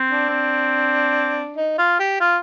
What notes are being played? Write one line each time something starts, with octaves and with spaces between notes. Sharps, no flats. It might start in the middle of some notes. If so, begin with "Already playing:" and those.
Already playing: C4
D4
C4
D#4
F4
G4
F4